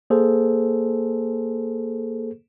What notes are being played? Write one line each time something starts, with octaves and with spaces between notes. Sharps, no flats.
A#3 G#4 A4 C5